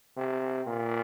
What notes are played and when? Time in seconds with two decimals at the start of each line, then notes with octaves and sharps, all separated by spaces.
0.17 C3
0.67 A#2